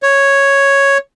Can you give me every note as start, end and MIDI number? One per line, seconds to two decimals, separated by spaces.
0.03 0.98 73